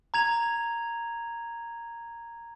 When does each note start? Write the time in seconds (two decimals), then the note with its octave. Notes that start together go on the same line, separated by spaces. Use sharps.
0.14 A#5 G#6 F7